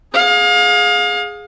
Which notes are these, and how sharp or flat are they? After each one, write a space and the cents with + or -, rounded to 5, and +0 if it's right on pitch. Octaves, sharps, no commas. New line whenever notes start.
G#4 +0 F5 +30